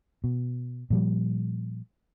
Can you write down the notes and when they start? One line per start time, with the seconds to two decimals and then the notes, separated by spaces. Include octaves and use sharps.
0.24 B2
0.90 A#2 F3 G3